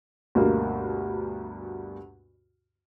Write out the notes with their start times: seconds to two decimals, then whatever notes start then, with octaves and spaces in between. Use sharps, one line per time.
0.35 D2 G2 B2 A#3